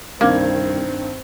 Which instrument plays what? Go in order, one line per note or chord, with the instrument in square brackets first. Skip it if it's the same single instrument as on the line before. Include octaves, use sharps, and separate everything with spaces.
[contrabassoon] C2 [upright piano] G2 D#3 G#6 [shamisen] A#3 [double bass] C4